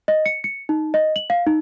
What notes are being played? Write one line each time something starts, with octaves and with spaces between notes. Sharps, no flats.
D#5
C#7
C#7
D#4
D#5
F#7
F5
D#4